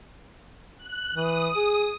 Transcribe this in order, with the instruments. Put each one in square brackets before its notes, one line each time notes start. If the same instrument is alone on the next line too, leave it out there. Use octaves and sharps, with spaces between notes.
[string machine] F#6
[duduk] E3 [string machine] D#6
[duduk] G#4